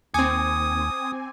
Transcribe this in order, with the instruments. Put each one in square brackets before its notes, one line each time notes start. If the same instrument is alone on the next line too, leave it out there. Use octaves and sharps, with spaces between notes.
[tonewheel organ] D#2 [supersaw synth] C4 G#5 [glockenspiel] D6 G#6 C#7 [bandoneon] D#6